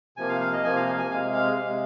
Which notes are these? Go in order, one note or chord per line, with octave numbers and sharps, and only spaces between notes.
C3 F3 A#3 G#5
F5
F5
D#5
C3 F3 A#3 G#5
F5
G#5
G#5
C3 G#3 F5
F5
C3 G#3